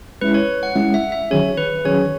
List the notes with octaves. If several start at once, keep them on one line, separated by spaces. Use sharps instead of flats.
G#3 C#4 E4 B4
C#5
F#5
G#3 C#4 E4 F#5
E5
E5
D#3 F#3 C#4 G#4 C#5
B4
D#3 F#3 C#4 G#4 C#5